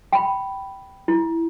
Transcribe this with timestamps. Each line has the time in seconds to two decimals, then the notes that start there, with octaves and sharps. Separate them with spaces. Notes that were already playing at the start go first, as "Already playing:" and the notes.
0.13 G5 B5
1.08 E4